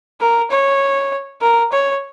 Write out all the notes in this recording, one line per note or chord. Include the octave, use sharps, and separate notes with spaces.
A#4
C#5
A#4
C#5